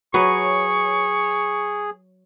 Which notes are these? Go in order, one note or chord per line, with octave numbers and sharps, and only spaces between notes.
F#3 G#4 B4 C#5 C#6